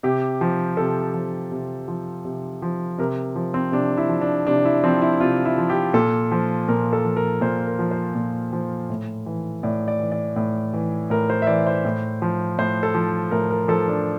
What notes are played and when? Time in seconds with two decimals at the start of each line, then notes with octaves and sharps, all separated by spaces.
0.03 C3 G4
0.41 F3
0.77 C3 A4
1.14 F3
1.52 C3
1.88 F3
2.25 C3
2.62 F3
2.98 C3 A#4
3.36 F3
3.54 C4
3.72 C3 D4
3.98 E4
4.09 F3
4.21 D4
4.47 C3 D4
4.65 E4
4.84 F3 C4
5.02 E4
5.21 C3 F4
5.45 E4
5.58 F3
5.70 G4
5.94 A#2 A4
6.32 F3
6.68 A#2 A#4
6.93 A4
7.04 F3
7.16 A#4
7.41 A#2 C5
7.66 A#4
7.79 F3
7.91 C5
8.15 A#2
8.53 F3
8.90 A2
9.26 E3
9.63 A2 D5
9.88 D5
10.00 E3
10.12 D5
10.36 A2
10.73 E3
11.10 A2 A#4
11.30 C5
11.42 E5
11.47 E3 D5
11.67 C5
11.85 A2
12.22 F3
12.58 A2 C5
12.83 A4
12.95 F3
13.31 A2 A#4
13.51 A#4
13.68 F3 A4
13.88 D4